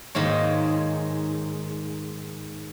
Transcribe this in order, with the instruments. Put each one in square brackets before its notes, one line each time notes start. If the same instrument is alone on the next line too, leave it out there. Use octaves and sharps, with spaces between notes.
[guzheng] G#2 D#3 A#3 C#5